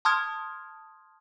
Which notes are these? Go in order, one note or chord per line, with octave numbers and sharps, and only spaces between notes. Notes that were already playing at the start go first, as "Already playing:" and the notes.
A5 C6 D#6 F6 G#6